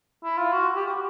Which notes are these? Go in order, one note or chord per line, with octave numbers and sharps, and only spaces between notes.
E4
F4
F#4
G4
F#4